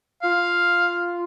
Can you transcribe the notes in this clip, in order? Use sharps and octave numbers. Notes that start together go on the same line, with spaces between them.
F4 F5